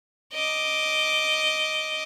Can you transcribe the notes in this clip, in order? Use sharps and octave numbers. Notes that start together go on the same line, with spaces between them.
D#5 D6